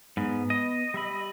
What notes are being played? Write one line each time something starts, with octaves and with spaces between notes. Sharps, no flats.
G#2 B3
D#5
G3 E5 B5